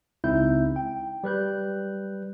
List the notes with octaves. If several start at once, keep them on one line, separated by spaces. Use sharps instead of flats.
C#2 C4 D#4 E4 E5 G6
G5
G3 B4 F#6 G6